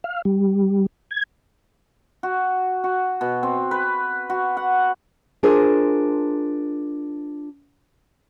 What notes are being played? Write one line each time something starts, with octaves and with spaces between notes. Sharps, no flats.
F5
G3
G#6
F#4
F#4
B2
C4
B4
F#4
F#5
D4 F4 G#4 A#4 C5